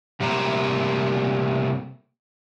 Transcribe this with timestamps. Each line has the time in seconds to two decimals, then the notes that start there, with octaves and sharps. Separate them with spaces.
0.20 C3 G3 A3 A#3 C5 A#5